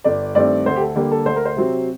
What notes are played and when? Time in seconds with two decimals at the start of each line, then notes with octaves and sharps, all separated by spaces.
0.04 G1 D5
0.35 G2 D#3 A3 C4 D5
0.66 D2 C5
0.76 G4
0.81 A4
0.95 D3 G3 A#3 G4
1.12 A4
1.26 D2 C5
1.36 A#4
1.45 C5
1.56 C3 F#3 C4